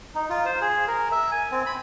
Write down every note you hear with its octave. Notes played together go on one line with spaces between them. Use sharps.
D#4
F4
C5
G#4
A#4
E5
G#5
C4
B5